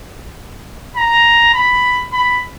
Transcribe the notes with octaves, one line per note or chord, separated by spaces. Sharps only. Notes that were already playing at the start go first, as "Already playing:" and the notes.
A#5
B5
B5